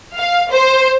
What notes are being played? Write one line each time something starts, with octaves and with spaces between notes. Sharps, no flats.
F5
C5